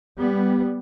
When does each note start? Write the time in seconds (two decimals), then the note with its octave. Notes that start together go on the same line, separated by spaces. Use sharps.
0.18 G3 B3